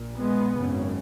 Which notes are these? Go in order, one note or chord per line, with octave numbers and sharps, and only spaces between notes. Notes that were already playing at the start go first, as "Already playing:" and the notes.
Already playing: A#1 A#2
G#3 B3
G#1 F#2 C#3